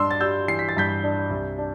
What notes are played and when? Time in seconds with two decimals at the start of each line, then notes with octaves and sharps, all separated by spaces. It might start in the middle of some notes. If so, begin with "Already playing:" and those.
Already playing: G2 D4 C6 E6
0.11 A6
0.20 G3 E6 G6
0.48 E3 C7
0.59 B6
0.69 A6
0.77 G2 G6 B6
1.03 D4
1.30 C2
1.58 D4